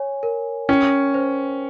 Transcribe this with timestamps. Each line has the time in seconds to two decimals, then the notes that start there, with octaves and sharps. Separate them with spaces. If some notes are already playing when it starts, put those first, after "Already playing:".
Already playing: C#5 G#5
0.23 A#4
0.69 C#4 G5
1.14 C5